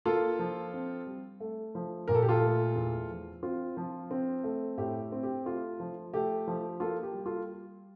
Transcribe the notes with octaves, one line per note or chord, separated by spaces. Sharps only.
A#3 F4 A4
F3
C4
G3
A3
F3
A#2 A#4
A4
G4
F4 A4
A3
E2
F3
C4 F4
F3
C4
A3
A2 G4
C4
G4
A3 F4
F3
A3 G4
F3
A#3 F4 A4
G4
G3
F4 A4